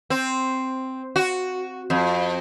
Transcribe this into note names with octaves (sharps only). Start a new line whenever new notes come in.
C4
F#4
F2